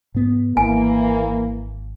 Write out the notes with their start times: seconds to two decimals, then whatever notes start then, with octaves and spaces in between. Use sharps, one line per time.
0.15 G#2 B3
0.57 G#1 E3 A#3 G#5